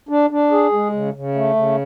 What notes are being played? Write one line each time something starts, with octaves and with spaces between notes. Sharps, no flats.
D4
D4
G#4
G#3
C#3
C#3
A3
C#3